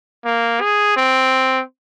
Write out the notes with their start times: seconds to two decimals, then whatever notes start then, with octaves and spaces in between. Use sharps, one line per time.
0.25 A#3
0.61 G#4
0.96 C4